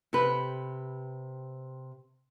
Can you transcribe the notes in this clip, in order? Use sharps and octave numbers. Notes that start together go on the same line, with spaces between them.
C3 G4 B4